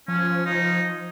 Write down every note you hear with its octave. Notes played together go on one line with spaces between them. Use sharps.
F3 C#4
D#4